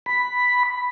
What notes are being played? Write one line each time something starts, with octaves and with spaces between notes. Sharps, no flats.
B5